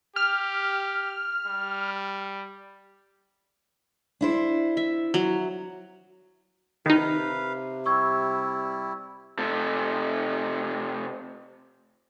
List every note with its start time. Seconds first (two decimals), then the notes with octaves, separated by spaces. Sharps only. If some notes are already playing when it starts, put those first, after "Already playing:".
0.16 G4 F6
1.46 G3
4.21 D4 E4 C5
4.77 E5
5.14 F#3
6.86 C3 D#3 D#4 B4 F5
7.86 G3 E4 C#6 E6 G#6
9.38 C3 A3